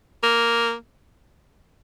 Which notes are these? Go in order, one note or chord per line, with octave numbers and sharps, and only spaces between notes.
A#3